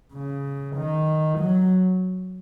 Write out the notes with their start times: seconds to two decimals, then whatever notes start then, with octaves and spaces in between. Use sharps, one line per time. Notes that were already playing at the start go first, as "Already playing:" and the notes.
0.14 C#3
0.76 D#3
1.39 F#3